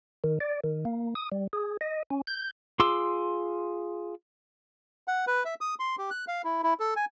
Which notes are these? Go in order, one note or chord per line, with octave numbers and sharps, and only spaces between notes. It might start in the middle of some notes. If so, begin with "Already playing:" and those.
D#3
D5
D#3
A#3
D#6
G3
G#4
D#5
C#4
G6
F4 G#4 C6 D6 E6
F#5
B4
E5
D#6
C6
G4
F#6
F5
E4
E4
A4
G#5